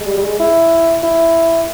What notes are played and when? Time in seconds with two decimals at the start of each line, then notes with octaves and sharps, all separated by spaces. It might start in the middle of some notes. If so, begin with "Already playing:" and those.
0.01 G#3
0.07 G3
0.17 G3
0.23 G#3
0.39 E4
1.03 E4